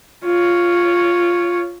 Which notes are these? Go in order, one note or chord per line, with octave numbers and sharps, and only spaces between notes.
F4 C#5